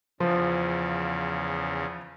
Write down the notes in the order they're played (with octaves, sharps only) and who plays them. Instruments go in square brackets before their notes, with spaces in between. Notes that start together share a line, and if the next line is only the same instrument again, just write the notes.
[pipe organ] E2 C#3 [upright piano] F3